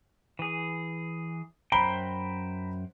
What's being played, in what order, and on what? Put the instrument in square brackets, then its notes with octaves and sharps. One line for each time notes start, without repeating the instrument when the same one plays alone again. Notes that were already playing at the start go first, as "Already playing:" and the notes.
[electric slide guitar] E3 G#4
[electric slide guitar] F#2 C5 G5 [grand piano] A#5 B5 G7